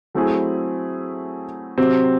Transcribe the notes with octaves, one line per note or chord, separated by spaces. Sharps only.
F#3 A3 C4 E4 G#4
C3 F#3 C4